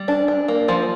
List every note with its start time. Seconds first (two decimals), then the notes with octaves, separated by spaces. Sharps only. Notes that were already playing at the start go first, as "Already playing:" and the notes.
Already playing: G3
0.08 D4
0.28 D4
0.48 A#3
0.68 F3